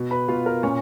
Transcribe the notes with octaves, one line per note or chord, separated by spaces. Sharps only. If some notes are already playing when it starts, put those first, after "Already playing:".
Already playing: B2
B4 B5
B2 F4 F5
A#4
A#2 C#4 C#5